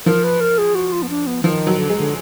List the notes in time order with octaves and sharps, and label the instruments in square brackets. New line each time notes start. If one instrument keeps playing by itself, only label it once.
[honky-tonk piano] F3 [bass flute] A#4
[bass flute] B4
A#4
G#4
F#4
F4
B3
D4
B3
[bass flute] D#3 [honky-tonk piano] F3
[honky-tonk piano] F#3
[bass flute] D3
[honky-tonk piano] G#3
[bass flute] D3